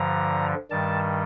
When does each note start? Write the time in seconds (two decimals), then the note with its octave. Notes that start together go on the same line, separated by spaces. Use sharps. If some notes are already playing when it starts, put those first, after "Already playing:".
Already playing: G2 D3 F3 A#5
0.70 G2 D#3 G3 A5